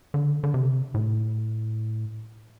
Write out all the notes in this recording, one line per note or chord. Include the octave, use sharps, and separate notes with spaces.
D3
D3
C3
A2